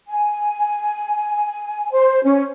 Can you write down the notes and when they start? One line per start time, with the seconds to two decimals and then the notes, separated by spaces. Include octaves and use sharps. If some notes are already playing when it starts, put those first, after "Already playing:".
0.07 G#5
1.92 C5
2.24 C#4